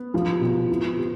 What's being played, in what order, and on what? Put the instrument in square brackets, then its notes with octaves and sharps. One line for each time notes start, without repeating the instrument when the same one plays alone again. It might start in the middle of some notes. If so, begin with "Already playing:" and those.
Already playing: [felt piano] B3
[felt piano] F3 [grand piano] G4
[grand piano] B2
E4
G4